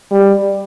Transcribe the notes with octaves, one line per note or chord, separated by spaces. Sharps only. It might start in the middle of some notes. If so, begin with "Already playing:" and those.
G3